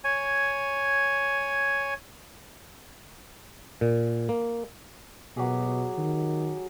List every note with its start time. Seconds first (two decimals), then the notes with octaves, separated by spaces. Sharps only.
0.04 C#5 G#5
3.81 A#2
4.29 A#3
5.37 B2 F#3 G4 G#4
5.98 D#3